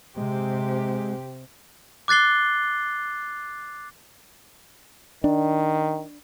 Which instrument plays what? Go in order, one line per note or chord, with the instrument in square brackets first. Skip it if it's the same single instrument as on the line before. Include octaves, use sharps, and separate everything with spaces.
[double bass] C3 C4 [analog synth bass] G#3 [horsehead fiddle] G4
[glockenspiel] D6 F#6 A6 C7 G7
[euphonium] D#3 [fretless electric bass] D4